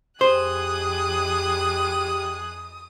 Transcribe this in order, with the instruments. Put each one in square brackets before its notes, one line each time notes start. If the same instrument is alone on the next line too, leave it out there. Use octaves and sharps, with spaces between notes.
[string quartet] F2 G#4 F#6 [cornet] G4 [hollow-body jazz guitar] C5 [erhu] D#6